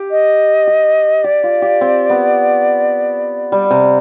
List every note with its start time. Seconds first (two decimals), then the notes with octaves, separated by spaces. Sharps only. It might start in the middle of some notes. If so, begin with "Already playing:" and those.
Already playing: G4
0.11 D#5
0.67 G4
1.24 G4 D5
1.44 F4
1.62 G4
1.81 C4
2.10 B3
3.52 G3
3.71 C3